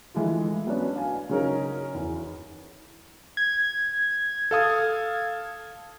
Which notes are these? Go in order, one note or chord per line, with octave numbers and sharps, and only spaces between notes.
E3 G#3 A3 F4
F#3 B3 C#4 D4
F5 G#5
C#3 F#3 C#4 D#4 A#4
E2
G#6
A4 F5 D#6